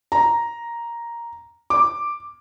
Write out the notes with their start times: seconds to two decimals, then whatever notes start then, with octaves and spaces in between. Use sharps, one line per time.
0.12 A#5
1.70 D6